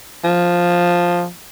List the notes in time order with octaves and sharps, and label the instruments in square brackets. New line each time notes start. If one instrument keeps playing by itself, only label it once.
[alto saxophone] F3